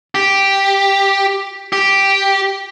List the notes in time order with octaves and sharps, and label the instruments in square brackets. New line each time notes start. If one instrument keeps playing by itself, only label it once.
[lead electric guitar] G4
G4